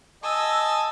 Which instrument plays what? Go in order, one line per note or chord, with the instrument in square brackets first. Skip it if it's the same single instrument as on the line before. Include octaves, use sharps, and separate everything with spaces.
[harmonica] D#5 G#5 A5 [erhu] E6